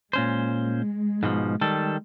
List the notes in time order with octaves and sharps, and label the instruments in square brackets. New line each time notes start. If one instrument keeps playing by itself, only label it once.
[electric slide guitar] A#2 C#4 C5 [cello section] G#3
[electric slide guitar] G#2 B2 F3
D#3 G3 A4